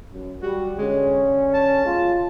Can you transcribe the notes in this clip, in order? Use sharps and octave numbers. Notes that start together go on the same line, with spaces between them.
F#2
G3 F#4
D3 G#3 C#4
A5
B2 G#3 F4